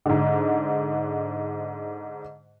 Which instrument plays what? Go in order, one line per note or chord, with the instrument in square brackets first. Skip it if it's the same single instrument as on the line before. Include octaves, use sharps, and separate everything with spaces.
[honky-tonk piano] G#2 D3